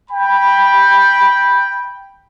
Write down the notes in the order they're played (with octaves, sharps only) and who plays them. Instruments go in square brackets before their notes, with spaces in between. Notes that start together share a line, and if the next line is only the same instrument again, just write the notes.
[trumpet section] G5 B5